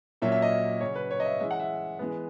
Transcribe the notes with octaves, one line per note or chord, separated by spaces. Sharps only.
A#2 F#3 A#3 C#4 E5
E5
D#5
C#3 F#3 C#4 C#5
B4
C#5
D#5
E5
E3 G#3 C#4 E5
F#5
E5
E3 G#3 B3